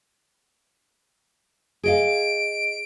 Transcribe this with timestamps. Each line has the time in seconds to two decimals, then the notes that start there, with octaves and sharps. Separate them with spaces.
1.83 G#4 D#5 F5 D7